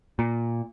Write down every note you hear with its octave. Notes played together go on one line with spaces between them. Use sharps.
A#2